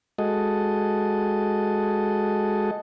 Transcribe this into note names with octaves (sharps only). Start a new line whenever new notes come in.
G#3 F#4 A4 D#5